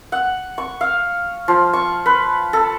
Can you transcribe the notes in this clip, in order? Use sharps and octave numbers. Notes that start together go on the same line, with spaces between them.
F#5
C#6
F5
F3
C#6
B4
A4